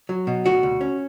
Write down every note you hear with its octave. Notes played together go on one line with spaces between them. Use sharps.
F#3
B2
D2 F#4
D2
C#4